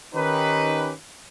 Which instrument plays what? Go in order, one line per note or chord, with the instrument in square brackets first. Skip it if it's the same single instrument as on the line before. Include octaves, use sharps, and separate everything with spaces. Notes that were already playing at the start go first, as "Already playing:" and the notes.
[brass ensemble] D#3 C#4 D#4 G4 B4